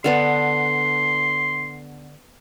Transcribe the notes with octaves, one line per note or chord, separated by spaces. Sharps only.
D3 B3 D4 C6